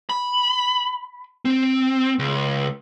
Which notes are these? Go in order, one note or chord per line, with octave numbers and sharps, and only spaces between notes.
B5
C4
C#2